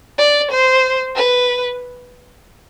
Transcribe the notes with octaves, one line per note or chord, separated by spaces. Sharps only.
D5
C5
B4